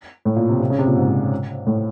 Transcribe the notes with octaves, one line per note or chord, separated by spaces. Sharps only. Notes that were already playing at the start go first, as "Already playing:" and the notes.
A2
A#2
C3
C3
C#3
C3
A#2
G#2
A2